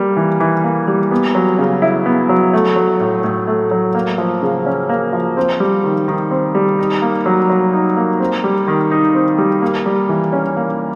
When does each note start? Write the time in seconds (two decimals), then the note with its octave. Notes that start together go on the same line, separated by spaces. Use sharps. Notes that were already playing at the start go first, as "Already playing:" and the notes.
Already playing: G3 A#3
0.17 E3
0.40 E3
0.64 A#3
0.87 G3
1.11 B3
1.35 F#3
1.59 C#3
1.82 E4
2.06 B3
2.29 F#3
2.53 A3
2.76 F#3
3.00 A2
3.24 A2
3.47 A3
3.71 F#3
3.95 A#3
4.18 F3
4.42 C#3
4.66 C#4
4.89 A#3
5.13 F3
5.37 C4
5.60 G3
5.84 D#3
6.08 D#3
6.31 C4
6.55 G3
6.79 D#4
7.02 A#3
7.26 F#3
7.50 F#3
7.73 D#4
7.97 A#3
8.20 C4
8.44 G3
8.68 D#3
8.91 D#4
9.15 C4
9.38 G3
9.62 A#3
9.86 G3
10.09 E3
10.33 C#4
10.57 A#3